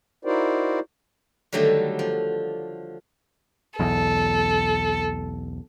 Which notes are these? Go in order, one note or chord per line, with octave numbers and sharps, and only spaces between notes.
D#4 E4 F#4 A#4 C5 D5
D3 D#3 F#3 G3 A3
F3
B1 E2 A4